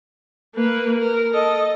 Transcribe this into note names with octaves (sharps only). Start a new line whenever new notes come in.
A#3 B4
A#4
A4 D#5